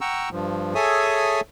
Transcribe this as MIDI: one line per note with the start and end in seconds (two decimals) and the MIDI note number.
0.01 0.29 78
0.01 0.29 79
0.01 0.29 82
0.01 0.29 85
0.01 0.29 88
0.32 0.74 43
0.32 0.74 53
0.75 1.41 68
0.75 1.41 69
0.75 1.41 73
0.75 1.41 76
0.75 1.41 80
0.75 1.41 87